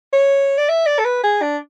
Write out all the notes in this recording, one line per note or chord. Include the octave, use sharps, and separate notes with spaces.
C#5
D5
E5
D5
A4
B4
G#4
D4